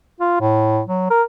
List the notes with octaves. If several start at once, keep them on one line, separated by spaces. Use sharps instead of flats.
F4
A2
F#3
A#4